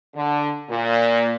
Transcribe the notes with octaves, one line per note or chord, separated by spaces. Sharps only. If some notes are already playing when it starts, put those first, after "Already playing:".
D3
A#2